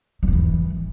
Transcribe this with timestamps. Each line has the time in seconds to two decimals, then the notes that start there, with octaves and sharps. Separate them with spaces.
0.23 F#3
0.28 G2
0.33 E3